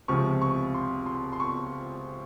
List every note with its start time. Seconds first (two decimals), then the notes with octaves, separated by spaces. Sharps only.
0.08 C#2 C3 F3 C#6
0.42 C#6
0.74 C6
1.06 C6
1.33 C6
1.40 C#6